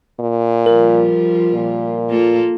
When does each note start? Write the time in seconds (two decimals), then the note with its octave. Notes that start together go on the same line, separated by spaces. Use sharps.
0.20 A#2
0.66 F3 G3 F4 A#4
1.54 A#2
2.09 A#3 F4 A4